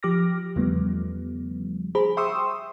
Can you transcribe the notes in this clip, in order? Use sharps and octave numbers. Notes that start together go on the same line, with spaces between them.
F3 G4 D6 F6 A#6
E2 C#3 F3 G3 A3 B3
G#4 C5 A#5 B5
E5 G5 C6 C#6 D#6 E6